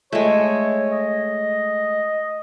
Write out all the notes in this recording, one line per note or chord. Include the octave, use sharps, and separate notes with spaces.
G#3 A3 C#5
D#5